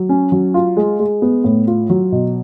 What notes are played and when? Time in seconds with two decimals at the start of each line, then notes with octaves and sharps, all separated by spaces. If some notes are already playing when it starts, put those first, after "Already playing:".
Already playing: F#3
0.09 C#4
0.32 F#3
0.54 F4
0.77 G#3
1.00 G#3
1.22 B3
1.44 A2
1.67 F4
1.90 F#3
2.12 B2